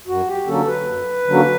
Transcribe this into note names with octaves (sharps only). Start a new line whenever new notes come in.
F#2 F#4
G4
D3 F#3 A#3 C#4 A4
B4
F#2
D3 F#3 A#3 C#4